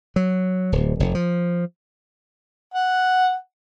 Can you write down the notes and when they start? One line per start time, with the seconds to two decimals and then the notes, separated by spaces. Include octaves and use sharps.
0.16 F#3
0.72 D1
1.00 F1
1.15 F3
2.74 F#5